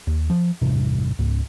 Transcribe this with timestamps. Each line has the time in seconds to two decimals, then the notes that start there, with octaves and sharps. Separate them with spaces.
0.07 D#2
0.30 F3
0.62 A1 E2 G2 C3
1.19 C#2 G#2